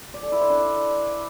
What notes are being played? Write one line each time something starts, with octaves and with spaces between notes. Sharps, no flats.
D5
A4
E4
C5
D4